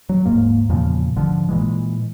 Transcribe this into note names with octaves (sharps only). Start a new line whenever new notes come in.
F#3
D#1 G#2 A#3
E2 A#2 C#3 F3
G#1 D3 F3
A#2 E3 G#3